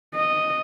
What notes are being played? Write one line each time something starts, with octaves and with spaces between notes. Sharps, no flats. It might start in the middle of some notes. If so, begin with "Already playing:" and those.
D#5